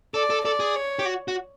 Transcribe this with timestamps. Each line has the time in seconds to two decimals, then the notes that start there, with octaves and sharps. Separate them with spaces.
0.14 A4 D5
0.30 A4
0.45 A4 D5
0.60 G#4
0.75 C#5
0.99 G4
1.05 F#4
1.28 F#4